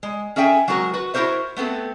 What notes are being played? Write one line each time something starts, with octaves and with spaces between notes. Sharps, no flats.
G#3
C#4 G#4 A4 E5 G5 G#5
F#3 G#3 C4 F#4 A#4
F#4 B4
E4 F#4 G4 A#4 C5 E5
A3 B3 C4 A4